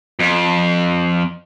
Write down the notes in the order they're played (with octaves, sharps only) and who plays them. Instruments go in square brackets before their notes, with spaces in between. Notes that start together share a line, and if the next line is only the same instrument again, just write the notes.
[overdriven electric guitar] F2